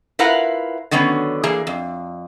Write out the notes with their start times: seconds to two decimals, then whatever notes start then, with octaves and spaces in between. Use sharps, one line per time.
0.19 E4 F4 A#4 B4 F5 F#5
0.91 D3 D#3 F#3 B3 C#4
1.44 E3 A#3 G#4
1.67 F2